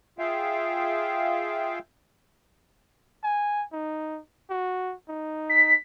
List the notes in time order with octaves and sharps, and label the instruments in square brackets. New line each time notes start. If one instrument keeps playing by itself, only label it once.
[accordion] F4 G#4 E5 F5 G5
[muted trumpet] G#5
D#4
F#4
D#4
[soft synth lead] B6